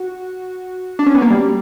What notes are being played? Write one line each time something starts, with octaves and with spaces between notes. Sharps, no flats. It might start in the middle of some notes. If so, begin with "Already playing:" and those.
Already playing: F#4
D4
C#4
B3
A#3
G3